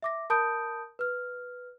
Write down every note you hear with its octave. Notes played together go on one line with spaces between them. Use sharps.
E5 D6 A#6
A#4 A5 B5 D#6 G6 D7
B4 F6